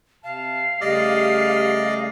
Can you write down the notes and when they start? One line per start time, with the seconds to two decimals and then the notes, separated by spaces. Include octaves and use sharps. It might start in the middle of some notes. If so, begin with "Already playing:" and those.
0.24 C3 F5 A5
0.81 C#3 G3 A3 G4 D5 D#5